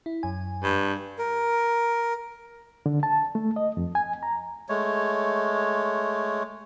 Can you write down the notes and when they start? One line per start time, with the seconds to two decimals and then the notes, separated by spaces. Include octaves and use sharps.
0.06 E4
0.23 F#2 G#5
0.63 G2
1.19 A#4
2.86 D3
3.03 A5
3.35 A3
3.56 D#5
3.77 F2
3.95 G#5
4.23 A#5
4.69 G#3 A3 C#5